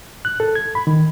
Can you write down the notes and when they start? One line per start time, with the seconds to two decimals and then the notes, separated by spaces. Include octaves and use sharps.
0.25 F#6
0.40 A4
0.55 G#6
0.75 B5
0.87 D#3